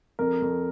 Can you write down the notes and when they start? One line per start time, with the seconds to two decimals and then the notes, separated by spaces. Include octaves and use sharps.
0.19 F2 A#4
0.42 F2